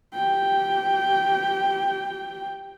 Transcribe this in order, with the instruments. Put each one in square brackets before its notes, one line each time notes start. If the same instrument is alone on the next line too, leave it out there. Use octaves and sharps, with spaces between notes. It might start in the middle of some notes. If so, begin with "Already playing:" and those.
[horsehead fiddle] G4 G5